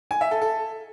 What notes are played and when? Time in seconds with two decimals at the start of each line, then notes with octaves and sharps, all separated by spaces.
0.11 G#5
0.21 E5
0.31 A4
0.42 A4